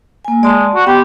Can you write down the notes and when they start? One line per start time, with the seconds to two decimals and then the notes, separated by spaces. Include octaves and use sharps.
0.25 A#3 G#5
0.43 G#3 D5 A5
0.75 F#4
0.87 B3 G4 C6